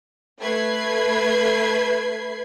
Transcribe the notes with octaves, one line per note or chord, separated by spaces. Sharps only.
A3 B4 B5 G#6 C7